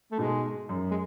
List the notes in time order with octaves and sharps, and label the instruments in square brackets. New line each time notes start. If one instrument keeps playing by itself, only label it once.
[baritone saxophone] A3
[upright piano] G#2 B2 [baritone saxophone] G#3
[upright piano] F#2
[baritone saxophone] G#3